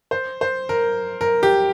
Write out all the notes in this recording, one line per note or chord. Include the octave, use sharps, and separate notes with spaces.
C5
C5
A#4
A#4
G4